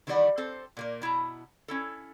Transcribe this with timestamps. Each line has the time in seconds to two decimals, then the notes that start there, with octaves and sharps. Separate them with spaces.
0.07 D#3 E3 G3 C#4 D5 F#5
0.38 C4 A4 C5
0.77 A#2 A#3 A#4
1.02 B2 E4 A5 A#5
1.68 C#4 E4 A4